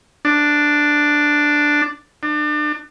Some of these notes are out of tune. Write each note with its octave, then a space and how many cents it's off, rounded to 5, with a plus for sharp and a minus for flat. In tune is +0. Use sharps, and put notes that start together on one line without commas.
D4 +5
D4 +35